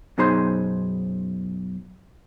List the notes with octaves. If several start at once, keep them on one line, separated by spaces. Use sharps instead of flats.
F#2 B2 D#4 G#4 C5 C6